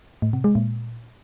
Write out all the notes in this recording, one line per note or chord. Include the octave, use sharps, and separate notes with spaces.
A2
C3
G#3
A#2